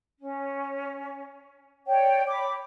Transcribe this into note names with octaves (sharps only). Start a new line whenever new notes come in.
C#4
C#5 D5 G5
B5 D6